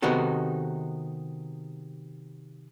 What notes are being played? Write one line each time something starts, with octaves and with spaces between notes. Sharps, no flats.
C3 D#3 B3 D#4 F#4 A4